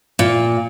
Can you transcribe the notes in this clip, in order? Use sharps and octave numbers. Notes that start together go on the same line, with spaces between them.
A#2